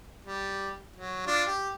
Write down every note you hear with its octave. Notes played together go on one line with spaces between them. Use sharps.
G3
F#3
D4 F4
G4